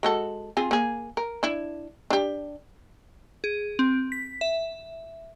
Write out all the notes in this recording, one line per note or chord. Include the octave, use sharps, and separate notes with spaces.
G#3 F#4 A4
C4 F4 G#4
A#3 G#4
A#4
D4 E4
D4 G4
G#4
C4
B6
E5